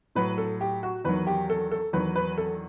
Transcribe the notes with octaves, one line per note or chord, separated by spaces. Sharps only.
A2 F#3 B4
A4
G4
F#4
E2 D#3 F#3 B4
G4
A4
A4
E2 D#3 F#3 B4
B4
A4